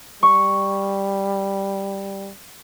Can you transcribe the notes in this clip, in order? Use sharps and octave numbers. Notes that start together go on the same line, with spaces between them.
G3 C#6